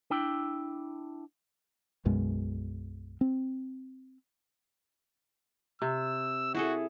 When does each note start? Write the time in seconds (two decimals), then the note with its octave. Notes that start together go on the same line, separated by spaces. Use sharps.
0.10 D4 E4 G5
2.05 B1 F#2 B2 G#3
3.21 C4
5.82 C3 E6
6.55 E4 F#4 G#4 A4